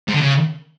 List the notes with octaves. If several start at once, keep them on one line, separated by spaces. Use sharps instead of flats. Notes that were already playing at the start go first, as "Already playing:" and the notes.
G#2
D3
C#3